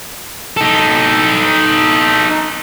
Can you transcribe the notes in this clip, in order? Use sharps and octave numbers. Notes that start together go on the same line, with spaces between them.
D#4 A4